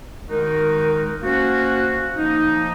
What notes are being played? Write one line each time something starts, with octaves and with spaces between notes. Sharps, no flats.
D#3 G#3 D#4 F#4 A#4
A#3 C#4 F#4 C5
F3 A#3 D#4